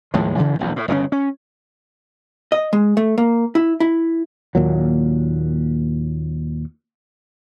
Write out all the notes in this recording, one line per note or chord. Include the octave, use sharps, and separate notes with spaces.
D#2 A2 F3 G#3
F#2 C#3 E3 F3
E1 A#1 E2
A2
G1 C#3 C4 C#4
C#4
D#5
G#3
A3
A#3
E4
E4
D#2 A#2 F#3